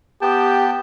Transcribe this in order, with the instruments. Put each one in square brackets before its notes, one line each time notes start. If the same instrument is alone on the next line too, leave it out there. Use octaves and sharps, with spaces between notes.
[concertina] B3 G5 A5 [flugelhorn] G4